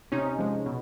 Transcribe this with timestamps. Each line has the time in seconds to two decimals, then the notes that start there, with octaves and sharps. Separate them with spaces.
0.12 C3 C#4 D#4
0.38 F3 G#3
0.66 B2